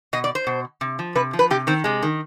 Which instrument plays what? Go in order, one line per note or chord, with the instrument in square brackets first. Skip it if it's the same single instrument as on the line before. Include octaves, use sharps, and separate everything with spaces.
[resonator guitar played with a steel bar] B2 D#5
D5
C5
B2
C3
F3
C3 B4
F3
B4
C3 G4
D#3 C4
C3 G#3
D#3